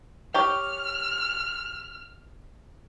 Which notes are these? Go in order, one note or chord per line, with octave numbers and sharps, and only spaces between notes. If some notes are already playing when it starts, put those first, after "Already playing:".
G4 C#5 G5 F6